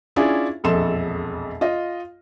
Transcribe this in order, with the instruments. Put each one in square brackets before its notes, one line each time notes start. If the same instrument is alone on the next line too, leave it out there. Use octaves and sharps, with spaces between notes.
[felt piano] C#4 D4 E4 F4 G#4
E1 A#1 F2 A4 C6 E7
F4 D#5